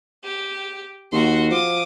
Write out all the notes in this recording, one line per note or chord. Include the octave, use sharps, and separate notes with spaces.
G4
D#2 F#4 C6
F3 D6 D#6